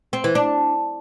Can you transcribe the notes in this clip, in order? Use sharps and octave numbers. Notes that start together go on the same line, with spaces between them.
C4
E3
D4